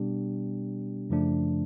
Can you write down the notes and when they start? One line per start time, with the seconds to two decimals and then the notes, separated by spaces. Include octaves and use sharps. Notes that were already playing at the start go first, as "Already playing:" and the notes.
Already playing: B2 G3 B3 D4 G4
1.10 F#2 C#3 F3 A3 D4